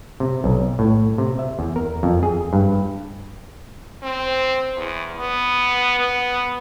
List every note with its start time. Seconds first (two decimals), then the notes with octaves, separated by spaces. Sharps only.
0.20 C3
0.44 B1
0.79 A2
1.18 C3
1.39 E5
1.59 E2
1.76 A#4
2.03 F2
2.23 G#4
2.53 G2
4.03 C4
4.76 E2
5.19 B3
5.99 B3